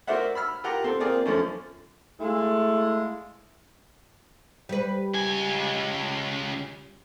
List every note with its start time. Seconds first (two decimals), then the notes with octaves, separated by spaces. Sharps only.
0.07 F#4 A#4 C5 D5 E5 F#5
0.35 B5 E6 F6
0.64 F4 G4 A#4 F#5 A#5
0.84 C4 A4 C6
1.00 A#3 C4 F4 G#4 A#4 D5
1.25 F#2 D3 F3 A3 C#4 D4
2.20 G#3 A3 E4 F4
4.69 G3 B4
5.15 C#2 G#5